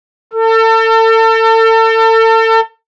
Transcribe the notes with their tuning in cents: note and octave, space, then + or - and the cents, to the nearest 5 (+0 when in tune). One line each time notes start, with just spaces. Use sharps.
A4 +35